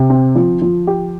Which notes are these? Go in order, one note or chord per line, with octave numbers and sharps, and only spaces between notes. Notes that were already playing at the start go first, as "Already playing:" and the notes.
Already playing: C3
C4
F3
F3
G4